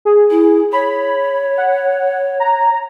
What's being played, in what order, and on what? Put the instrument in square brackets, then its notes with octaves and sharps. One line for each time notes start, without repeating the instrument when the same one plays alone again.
[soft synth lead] G#4
[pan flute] E4
[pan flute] C#5 [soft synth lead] B5
[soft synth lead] F#5
A#5